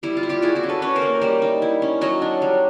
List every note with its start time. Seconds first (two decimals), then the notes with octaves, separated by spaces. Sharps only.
0.03 G3 E4
0.17 F4
0.23 E4
0.29 F4 G4
0.42 E4 F#4 G#4
0.55 E4 F#4
0.63 C#4
0.69 A4 B4
0.82 C#4 B4 C#5
0.95 A#4 C5
1.02 A#3
1.21 G3 C5 D5
1.42 D#4
1.62 E4
1.82 C#4
2.01 F#3 C#5 D#5
2.22 D4
2.42 G3